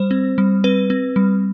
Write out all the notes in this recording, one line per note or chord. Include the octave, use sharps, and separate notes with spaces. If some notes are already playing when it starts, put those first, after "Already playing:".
Already playing: G3 C5
C4
G3
C4 B4
C4
G3